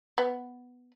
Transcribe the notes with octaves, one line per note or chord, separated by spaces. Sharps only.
B3